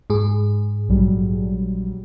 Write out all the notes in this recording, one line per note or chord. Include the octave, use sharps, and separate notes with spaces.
G#2 G#4
A#1 F#3 G3